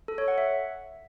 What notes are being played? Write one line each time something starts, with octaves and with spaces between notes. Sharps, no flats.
A4
C#5
F#5
E5